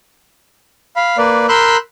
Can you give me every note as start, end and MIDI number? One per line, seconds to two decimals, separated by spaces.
0.96 1.17 77
0.96 1.17 83
1.18 1.46 58
1.18 1.46 71
1.18 1.46 74
1.49 1.77 70
1.49 1.77 83
1.49 1.77 84
1.49 1.77 88
1.49 1.77 90
1.49 1.77 91